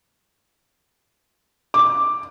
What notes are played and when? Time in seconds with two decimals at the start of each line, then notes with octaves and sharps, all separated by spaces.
1.74 D6